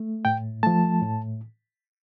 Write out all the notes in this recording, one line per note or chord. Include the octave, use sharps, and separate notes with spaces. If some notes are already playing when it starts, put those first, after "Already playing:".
Already playing: A3
A2 G5
F3 A3 A5
A2